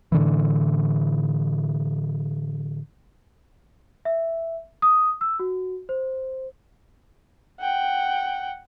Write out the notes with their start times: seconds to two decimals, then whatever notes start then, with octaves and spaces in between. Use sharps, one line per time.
0.12 A2 D3 E3
4.05 E5
4.82 D#6
5.21 E6
5.39 F#4
5.89 C5
7.60 F#5 G5